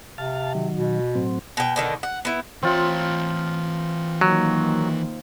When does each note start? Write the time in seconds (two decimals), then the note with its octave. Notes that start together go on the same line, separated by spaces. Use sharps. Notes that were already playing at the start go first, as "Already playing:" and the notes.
0.18 C3 F5 A5
0.55 D#3 F#3
0.76 B2
1.15 A2 F#3 C4
1.57 B2 G5
1.76 B2 D3 D#3
2.03 F#5
2.25 B3 E4
2.63 E3 C4 F4 C#5 E5
4.21 D#3 F#3 A#3